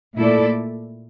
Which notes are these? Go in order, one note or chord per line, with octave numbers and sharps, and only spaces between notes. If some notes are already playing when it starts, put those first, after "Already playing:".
A#2 A3 E4 A4 D5